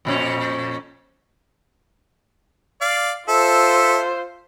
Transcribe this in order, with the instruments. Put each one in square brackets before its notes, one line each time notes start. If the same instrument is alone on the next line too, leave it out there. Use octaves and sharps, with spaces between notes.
[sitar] F2 A#2 C#4
[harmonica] D5 F5
[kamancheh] F4 C5 [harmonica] A4 E5